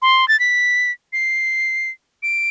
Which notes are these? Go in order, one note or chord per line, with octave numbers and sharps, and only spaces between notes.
C6
A6
B6
C7
D7